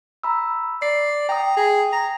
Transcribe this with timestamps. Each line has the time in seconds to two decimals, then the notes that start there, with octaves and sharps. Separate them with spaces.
0.23 A#5 B5 E6
0.82 D5 C7
1.29 G5 A#5 D#6
1.57 G#4
1.93 A#5